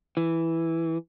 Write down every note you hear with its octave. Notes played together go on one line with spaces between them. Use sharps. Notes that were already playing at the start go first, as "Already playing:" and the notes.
E3